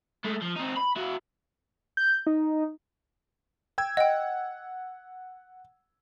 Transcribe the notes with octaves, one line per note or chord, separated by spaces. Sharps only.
G#3 A3
F3
C4 D#4
B5
E4 F#4
G6
D#4
G5 E6 G#6
D#5 F#5 G5